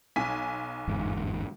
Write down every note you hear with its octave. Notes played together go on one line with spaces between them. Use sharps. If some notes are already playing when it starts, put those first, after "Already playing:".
B1 G#5 B6
G1 E2 G#2